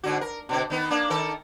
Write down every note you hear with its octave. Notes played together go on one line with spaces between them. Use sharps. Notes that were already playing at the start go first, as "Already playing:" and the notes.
G#2 D3 F#4
A#4
B2 D3 C4
D#3 B3 D#4
A#3 D4
D#3 A4 A#4